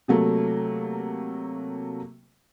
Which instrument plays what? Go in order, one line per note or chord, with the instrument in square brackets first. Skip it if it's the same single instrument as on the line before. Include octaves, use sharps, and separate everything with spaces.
[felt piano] C3 F#3 A3 A#3